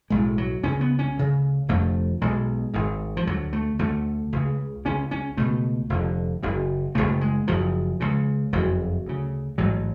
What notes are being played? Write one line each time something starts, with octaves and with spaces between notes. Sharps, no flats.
B1 A2 G#3
F#3
C#2 C#3 C#4
B3
C#4
D2 C#3
F1 F2 D3 A3
B1 B2 G#3
G#1 G#2
F3
D2 D3 F#3
A3
D2 D3 A3
C#2 C#3
C#2 C#3 C#4
C#4
C#2 B2 A3
F1 F2 D3
F#1 F#2 C#3
F#1 F2 C#3 A3
G#3
F#1 F#2 C#3 F3
C#2 C#3
F#1 F2 C#3 F#3
D2 C#3
A1 G#2 F#3